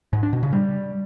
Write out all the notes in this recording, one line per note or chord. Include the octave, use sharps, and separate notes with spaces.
G#2
D4
B2
C#3
G3